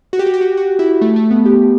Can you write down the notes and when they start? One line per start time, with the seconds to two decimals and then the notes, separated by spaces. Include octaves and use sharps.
0.13 F#4
0.19 G4
0.27 F#4
0.34 G4
0.41 F#4
0.57 F#4
0.79 E4
1.01 A3
1.16 A3
1.31 B3
1.46 G4